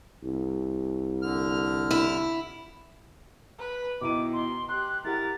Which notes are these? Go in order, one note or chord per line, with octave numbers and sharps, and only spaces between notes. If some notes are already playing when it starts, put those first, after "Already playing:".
C2
D3 F6
E4
B4
B2 D#3 E4 D6 D#7
C6
G4 C6 F#6
E4 G4 A#4 F#5 A6